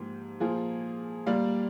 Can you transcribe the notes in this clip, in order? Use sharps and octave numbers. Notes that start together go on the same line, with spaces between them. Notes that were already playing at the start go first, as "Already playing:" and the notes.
Already playing: G#2 F3 A#3 G4
A#2 F3 A#3 F4 G#4
A#2 G3 A#3 D5 F5